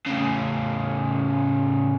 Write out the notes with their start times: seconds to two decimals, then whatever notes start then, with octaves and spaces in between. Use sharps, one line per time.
0.07 A2 C#3